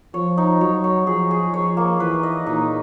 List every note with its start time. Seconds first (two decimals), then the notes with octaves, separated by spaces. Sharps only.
0.14 F3 C#5
0.37 D#4
0.61 F#3 C#5
0.84 C#5
1.07 F3 G#4
1.31 G#4
1.54 F3 C#5
1.77 A#3
2.00 E3 B4
2.23 D#5
2.47 A#2 D#4